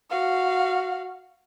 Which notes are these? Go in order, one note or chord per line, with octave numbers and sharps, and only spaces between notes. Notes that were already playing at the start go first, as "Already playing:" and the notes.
F#4 F5